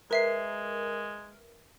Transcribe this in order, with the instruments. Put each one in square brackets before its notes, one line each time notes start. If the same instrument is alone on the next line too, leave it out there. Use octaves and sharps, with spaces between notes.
[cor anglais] G#3 [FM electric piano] A#4 [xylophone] B4 E5 C7